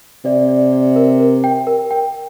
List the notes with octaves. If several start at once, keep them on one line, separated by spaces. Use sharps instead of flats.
C3 D5
D5
D5
A#4
A#4
G5
A#4
G5